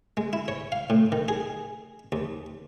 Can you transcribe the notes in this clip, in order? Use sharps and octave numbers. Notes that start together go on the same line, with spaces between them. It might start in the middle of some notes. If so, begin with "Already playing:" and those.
G#3
E4
C#5
F5
A2
D#3
G#4
D#2